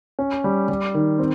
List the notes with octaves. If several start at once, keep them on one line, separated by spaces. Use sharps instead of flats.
C#4
G3
G3
D#3
C4